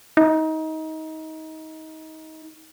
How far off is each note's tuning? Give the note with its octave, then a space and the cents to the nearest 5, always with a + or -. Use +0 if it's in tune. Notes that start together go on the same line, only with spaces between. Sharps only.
D#4 +25